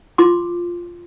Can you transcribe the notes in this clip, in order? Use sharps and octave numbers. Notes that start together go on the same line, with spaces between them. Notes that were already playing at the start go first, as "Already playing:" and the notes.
F4 C6 D6